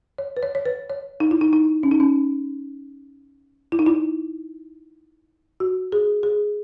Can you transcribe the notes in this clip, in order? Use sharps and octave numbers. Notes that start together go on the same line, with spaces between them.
C#5
B4
C#5
C#5
B4
C#5
D#4
E4
D#4
D#4
C#4
D#4
C#4
E4
D#4
E4
F#4
G#4
G#4